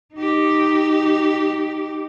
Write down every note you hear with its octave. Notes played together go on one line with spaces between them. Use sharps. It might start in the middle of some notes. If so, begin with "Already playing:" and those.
D#4 G4